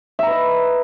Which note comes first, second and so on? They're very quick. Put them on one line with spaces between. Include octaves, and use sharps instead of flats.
E5 A#5 B4 D#5